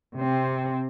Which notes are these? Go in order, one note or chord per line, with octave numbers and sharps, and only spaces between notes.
C3 C4